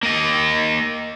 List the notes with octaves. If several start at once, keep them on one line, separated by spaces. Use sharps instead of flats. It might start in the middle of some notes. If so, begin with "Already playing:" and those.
A#3 D#5